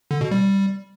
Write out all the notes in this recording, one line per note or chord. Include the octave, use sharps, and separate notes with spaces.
D3
B2
G3